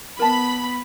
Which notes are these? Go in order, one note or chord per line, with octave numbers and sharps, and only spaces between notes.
B3 A#4 A5 B5